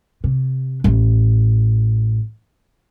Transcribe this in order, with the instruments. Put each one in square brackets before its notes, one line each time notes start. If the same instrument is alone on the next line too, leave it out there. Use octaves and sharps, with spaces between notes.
[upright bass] C3
A1